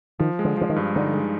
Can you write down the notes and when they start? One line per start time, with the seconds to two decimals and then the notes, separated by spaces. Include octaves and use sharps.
0.19 D#3 F3
0.39 G#3
0.45 D3
0.57 D3 F3
0.69 D#3
0.76 G2
0.95 D3 D#4
1.14 G#3